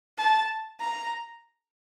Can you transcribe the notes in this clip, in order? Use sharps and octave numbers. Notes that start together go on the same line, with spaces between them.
A5
A#5